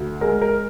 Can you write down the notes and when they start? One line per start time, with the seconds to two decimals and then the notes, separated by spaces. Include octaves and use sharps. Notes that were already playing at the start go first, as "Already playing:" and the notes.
Already playing: D2
0.21 G#3 A#4
0.42 A#4